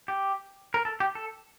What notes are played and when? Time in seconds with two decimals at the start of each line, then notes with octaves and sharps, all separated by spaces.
0.08 G4
0.74 A#4
0.85 A4
1.00 G4
1.15 A4